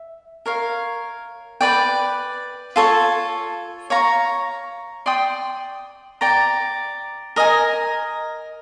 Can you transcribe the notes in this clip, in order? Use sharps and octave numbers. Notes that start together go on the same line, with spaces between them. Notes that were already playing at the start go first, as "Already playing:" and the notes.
Already playing: E5
A#4 C#5 F5
B4 D5 G5
F4 A4 C#5
C#5 F5 A#5 C#6
D5 G5 C6 D#6
D5 G5 A#5
A#4 D#5 G#5